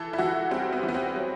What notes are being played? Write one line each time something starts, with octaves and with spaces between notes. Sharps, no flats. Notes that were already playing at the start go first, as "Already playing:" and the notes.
Already playing: E3 A4
E4
E3 F#4
G3 C4
B3
E3
B3
C4
F#3